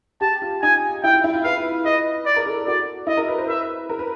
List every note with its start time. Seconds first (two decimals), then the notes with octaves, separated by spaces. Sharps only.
0.21 G4 A5
0.42 F4
0.62 D#4 G#5
1.03 E4 G5
1.13 F4
1.24 E4
1.34 F4
1.44 B4 F5
1.85 B4 D#5
2.26 D5
2.36 A#4
2.46 A4
2.67 F#4 D5
3.07 E4 D#5
3.17 A#4
3.28 B4
3.38 C5
3.48 B4 E5
3.89 A#4
3.99 B4